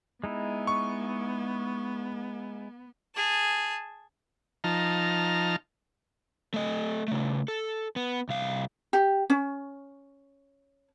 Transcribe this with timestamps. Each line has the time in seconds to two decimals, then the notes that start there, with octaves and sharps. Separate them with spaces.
0.24 G#3 B3 D#4 E4
0.67 C#6
3.15 G#4 A5
4.64 F3 D#4 A5 A#5 F6
6.54 A3 D#5
7.08 C#3 A3
7.48 A4
7.96 B3
8.29 C2 F5
8.93 G4
9.30 C#4